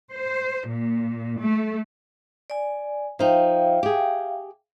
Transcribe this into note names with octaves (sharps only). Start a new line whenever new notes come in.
C5
A#2
A3
D5 G#5
F3 D#4 E5 F5 G5
G4 G#4